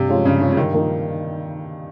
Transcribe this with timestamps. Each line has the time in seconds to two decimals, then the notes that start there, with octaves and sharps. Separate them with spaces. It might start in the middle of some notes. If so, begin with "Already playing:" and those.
Already playing: G2 C3
0.09 F3 G#3 C#4 F4
0.25 G2 C#3
0.41 F3 G#3 C#4 F4
0.52 C#3
0.57 G2 D#3
0.73 F3 A#3 D#4